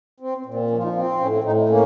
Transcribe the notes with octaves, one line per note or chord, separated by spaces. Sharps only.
C4
C4
A#2
C4
F3 C#4
F4
D#4
C4 F4
A2 C#4
A2 D#4
A#3 C#4